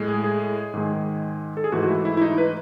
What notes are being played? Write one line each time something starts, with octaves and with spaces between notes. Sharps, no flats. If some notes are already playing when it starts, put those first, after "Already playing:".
Already playing: A2 G#3
G#4
G#4
G#2 D#3 G#3
A4
G#4
G#2 E3 A3 F#4
F#4
E4
E4
E4
D#4
B4